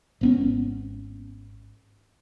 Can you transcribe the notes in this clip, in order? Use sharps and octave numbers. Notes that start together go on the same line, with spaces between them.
G#1 B3 C#4